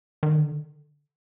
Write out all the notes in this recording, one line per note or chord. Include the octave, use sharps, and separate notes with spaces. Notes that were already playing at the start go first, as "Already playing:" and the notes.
D#3
D3